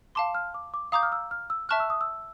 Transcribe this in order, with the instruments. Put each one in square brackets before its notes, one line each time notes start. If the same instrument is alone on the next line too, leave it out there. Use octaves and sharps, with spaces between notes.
[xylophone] F5 A5 C6 [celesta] D6
[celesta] F6
D6
D6
[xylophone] F5 A#5 D6 G6 [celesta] D#6
[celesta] F6
E6
F6
E6
[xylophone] E5 A5 C#6 F#6 [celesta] F6
[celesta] E6
D#6
E6